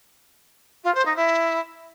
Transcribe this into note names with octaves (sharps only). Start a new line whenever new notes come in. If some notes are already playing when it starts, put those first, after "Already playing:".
F4
C5
D#4
E4